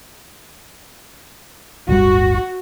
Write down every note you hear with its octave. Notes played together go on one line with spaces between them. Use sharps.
D1 G1 G3 F#4